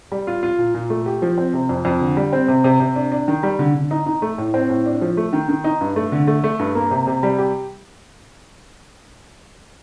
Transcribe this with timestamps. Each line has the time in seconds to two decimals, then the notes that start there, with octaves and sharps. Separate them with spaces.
0.12 G3
0.27 F4
0.43 F4
0.59 A#2
0.74 A#2
0.90 A3
1.06 G4
1.22 F3
1.38 C4
1.54 C3
1.69 F2
1.85 F2
2.01 D3
2.17 G3
2.33 C4
2.48 C3
2.64 C3
2.80 C3
2.96 D4
3.12 D4
3.28 D#3
3.43 G3
3.59 D3
3.75 D3
3.91 D#4
4.06 D#4
4.22 A3
4.38 A2
4.54 C4
4.70 A2
4.86 D4
5.01 F3
5.17 A3
5.33 D#3
5.49 D#3
5.64 D#4
5.81 G2
5.96 A3
6.12 D3
6.27 A3
6.44 A3
6.59 G2
6.75 A#3
6.91 C3
7.07 C3
7.23 G3
7.39 G4